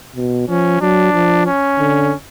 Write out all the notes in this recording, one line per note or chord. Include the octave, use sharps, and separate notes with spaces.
B2
F3 C#4
F#3 D4
F3
C#4
D3